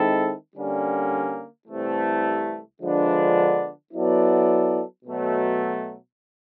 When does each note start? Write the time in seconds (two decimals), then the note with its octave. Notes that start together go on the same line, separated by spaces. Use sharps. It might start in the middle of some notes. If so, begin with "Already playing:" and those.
Already playing: D#3 G#3 C4 E4 A4
0.55 D3 G3 A#3 C#4
1.68 C2 C3 E3 A3
2.81 D3 F3 G#3 B3 D4
3.93 F#3 B3 E4 A4 D5
5.05 B2 F#3 A3